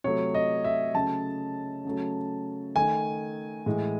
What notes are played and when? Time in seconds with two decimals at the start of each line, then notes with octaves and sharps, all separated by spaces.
0.04 C3 F#3 A3 C#5
0.34 D#5
0.64 E5
0.95 C#3 F#3 A3 A5
1.85 C#3 F#3 A3
2.76 D#3 A3 G#5
3.66 A2 E3 G#3